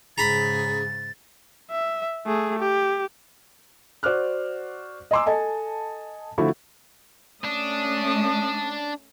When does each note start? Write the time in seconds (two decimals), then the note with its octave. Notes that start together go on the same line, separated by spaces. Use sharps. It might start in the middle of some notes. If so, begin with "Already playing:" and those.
0.18 G#2 C#3 G#4 A#5 B5 A6
1.71 E5
2.26 A3 G#4
2.59 G4
4.03 F#4 C5 D5 D6 F6 F#6
5.11 D#5 G#5 A#5 C6 D6 E6
5.26 A4 D#5 G#5 A5
6.38 D3 F3 A3 E4 F#4 A4
7.44 A3 C#4 D4 D#6